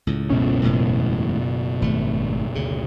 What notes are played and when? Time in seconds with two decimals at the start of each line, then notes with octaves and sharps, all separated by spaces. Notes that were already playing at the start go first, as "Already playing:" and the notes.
0.07 C#2 A2
0.30 F#1 B2 C#4
0.63 E1 A2 G#3
1.82 G#1 A3
2.55 D2 C#3